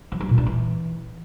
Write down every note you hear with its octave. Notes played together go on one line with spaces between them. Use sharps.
F3
F#3
A#2
D4
E3